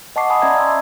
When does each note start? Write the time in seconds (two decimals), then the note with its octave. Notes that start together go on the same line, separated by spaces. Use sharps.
0.16 D#5 F#5 A5 C#6 D6 C7
0.30 G#5 A5 B5 D#6
0.42 C#4 D5 E5 A#5 B5 G#6
0.57 C6 D6 E6